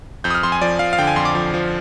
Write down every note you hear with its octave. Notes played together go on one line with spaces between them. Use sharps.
F2 G6
D#6
F6
F2 C6
G#5
F3 D5
F3 F5
F5
D3 G5
G#5
F2 C6
D6
F3
F3